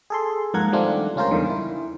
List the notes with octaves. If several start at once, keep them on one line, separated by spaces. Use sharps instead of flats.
G#4 A4 C6
F2 G#2 A#3 A#4 F#5 G#6
D#3 G3 A3 C4 D4 F4
C#2 C#4 F4 A#4 C5
E2 G2 D3 D#3
E4